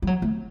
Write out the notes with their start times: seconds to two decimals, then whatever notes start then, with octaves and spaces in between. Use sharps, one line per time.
0.02 G3
0.07 F#3
0.22 A3